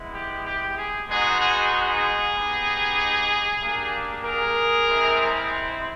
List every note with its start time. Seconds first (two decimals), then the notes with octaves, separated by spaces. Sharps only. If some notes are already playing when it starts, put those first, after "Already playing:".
Already playing: G#3 B3 E4
0.13 G4
0.45 G4
0.77 G#4
1.09 G#3 B3 D#4 F#4 G#4
1.40 G#4
1.71 G#4
2.35 B3 D#4 G4
3.61 A#3 D4 G4
4.23 G#4 A#4
4.87 G#3 C4 E4